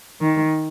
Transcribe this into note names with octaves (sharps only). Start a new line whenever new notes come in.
D#3